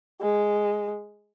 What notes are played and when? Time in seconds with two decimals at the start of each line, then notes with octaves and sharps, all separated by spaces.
0.21 G#3